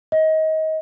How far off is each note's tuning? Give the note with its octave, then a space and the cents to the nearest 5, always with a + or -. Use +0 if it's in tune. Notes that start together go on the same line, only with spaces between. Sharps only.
D#5 +25